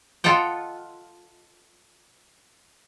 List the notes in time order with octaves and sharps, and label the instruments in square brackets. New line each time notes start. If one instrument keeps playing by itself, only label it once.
[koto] F4 A4 D#5 F#5 G5